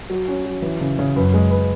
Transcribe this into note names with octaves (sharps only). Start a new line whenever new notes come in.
F#3
C#4
F#3
E3
C#3
C#3
F#2 B4
G#3
B4